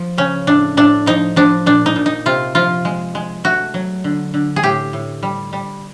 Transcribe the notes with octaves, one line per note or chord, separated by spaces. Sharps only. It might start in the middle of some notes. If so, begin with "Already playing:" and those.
Already playing: F3
C#3 C#4
A2 D4
A2 D4
F3 D#4
F3 D4
A#2 D4
D#4
A#2
D#4
C3 F4
F3 F4
G#3
G#3
A3 F#4
F#3
D3
D3
G#4
A2 G4
A2
G3
G3